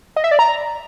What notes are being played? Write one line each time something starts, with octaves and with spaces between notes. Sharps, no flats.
D#5
E5
D5
A#5